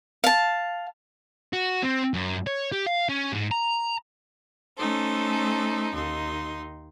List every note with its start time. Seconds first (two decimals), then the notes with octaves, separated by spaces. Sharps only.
0.24 F5 A5
1.53 F#4
1.83 C4
2.14 F#2
2.47 C#5
2.72 G4
2.86 F5
3.09 C#4
3.32 G#2
3.51 A#5
4.77 A3 C#4 D#4 A4 C5
5.94 D#2 D#4 C6